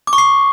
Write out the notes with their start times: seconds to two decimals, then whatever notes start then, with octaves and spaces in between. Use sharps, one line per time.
0.07 D6
0.13 C#6
0.18 C7